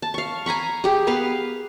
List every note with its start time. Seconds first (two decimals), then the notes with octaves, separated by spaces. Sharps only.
0.02 A5
0.14 F5 C#6
0.46 G#5 A#5 B5 C#6
0.84 G4 G#4
1.07 B3 B4 F5